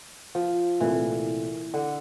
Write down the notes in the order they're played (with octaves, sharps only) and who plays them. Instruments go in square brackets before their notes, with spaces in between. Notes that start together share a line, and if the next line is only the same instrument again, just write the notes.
[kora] F3
[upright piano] C2 A#2 A3 C4 E4 [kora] E3
[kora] D3